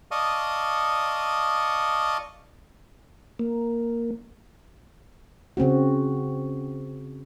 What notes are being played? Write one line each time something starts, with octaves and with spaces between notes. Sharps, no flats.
D5 D#5 F5 A5 C#6 D#6
A#3
C#3 C4 C#4 F#4